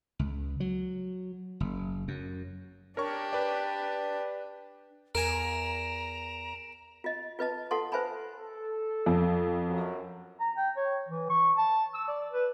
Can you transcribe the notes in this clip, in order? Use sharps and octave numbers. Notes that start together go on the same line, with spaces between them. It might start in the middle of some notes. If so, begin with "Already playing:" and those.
C#2
F#3
F#1
F#2
D4 G4 A#4 C#5 C#6
B4 D5
E2 A#4 G#5 A#5 D7 E7
F4 D#5
F4 B4 D#5 A5
F4 A4 F#5 A5 C6
B4 C5 E5 G#5 A5 B5
A4
F2
F#2
A#5
G5
C#5
E3
C#6
A5
E6
D5
B4